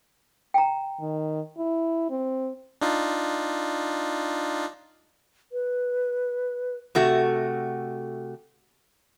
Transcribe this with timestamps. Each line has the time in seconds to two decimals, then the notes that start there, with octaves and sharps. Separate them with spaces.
0.54 G5 A#5
1.00 D#3
1.58 E4
2.10 C4
2.81 D4 D#4 F4
5.52 B4
6.95 C3 A3 F#4